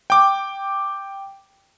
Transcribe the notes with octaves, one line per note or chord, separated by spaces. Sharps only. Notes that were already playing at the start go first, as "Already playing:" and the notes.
G5 D6